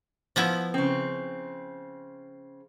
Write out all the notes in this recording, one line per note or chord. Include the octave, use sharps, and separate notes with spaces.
F3 B3 E4
C#3 C4